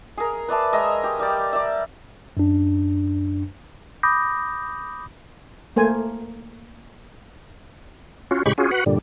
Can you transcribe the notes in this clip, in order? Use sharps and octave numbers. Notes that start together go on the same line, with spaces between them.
G#4 A#4
B4 D5 E5 A5
G#3 A#4 D#5 E5
G4
G3 D5
D5 E5
F#2 D4
B5 D6 D#6 G6 A#6
A3 A#3 C5 G#5
C#4 F4 F#4
A2 C#3 G#3 G4 B5 C#6
C#4 F4 F#4 G#4
F#4 B4 F#5
G2 A#2 D3 G3